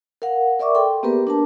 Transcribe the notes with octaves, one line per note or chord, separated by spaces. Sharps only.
A#4 F5 F#5
A#4 D5 E5 C#6 D6
A4 G5 C6
A#3 B3 G4 G#4 A#4 B4
D4 A#4 A5